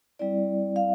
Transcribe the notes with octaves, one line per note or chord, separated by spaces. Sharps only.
G3 C4 E4 D5
F5